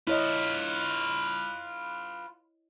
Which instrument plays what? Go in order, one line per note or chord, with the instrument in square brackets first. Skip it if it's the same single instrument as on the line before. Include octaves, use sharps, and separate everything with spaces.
[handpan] E4 C#5 D#5 [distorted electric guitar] F4 B4